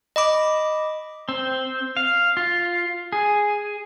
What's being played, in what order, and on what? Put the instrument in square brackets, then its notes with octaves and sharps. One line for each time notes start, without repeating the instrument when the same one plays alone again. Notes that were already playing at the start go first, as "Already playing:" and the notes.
[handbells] D#5 B5 D6
[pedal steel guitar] C4
F5
F4
G#4